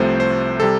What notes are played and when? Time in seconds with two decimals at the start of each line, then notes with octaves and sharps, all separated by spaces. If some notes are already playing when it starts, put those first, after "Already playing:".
Already playing: C2 C3 F3 A3 C5
0.20 C5
0.60 C3 G3 A4